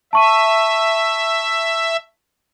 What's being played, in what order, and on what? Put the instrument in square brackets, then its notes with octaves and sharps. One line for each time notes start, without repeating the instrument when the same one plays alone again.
[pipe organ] E5 [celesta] A5 C#6 D#7